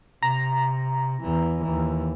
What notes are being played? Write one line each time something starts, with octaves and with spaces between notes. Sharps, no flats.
C3 A#5
E2 E3
D#2 E3